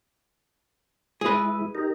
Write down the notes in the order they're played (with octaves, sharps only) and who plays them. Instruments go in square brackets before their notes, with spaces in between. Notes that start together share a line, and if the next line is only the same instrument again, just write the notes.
[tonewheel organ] G#3 E4 [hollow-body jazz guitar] G#4 B4
[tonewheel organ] D#4 G4 A#4